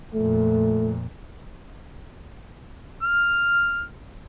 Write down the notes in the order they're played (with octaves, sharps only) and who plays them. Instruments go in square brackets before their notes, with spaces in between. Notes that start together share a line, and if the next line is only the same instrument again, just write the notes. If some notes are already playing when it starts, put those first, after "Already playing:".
[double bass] F2 A#2 [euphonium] A3
[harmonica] F6